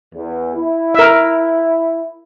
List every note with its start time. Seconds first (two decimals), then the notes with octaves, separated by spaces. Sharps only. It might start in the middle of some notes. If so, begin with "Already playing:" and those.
0.14 E2
0.55 E4
0.95 A#4 E5